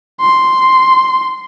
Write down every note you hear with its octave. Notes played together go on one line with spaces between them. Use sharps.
C6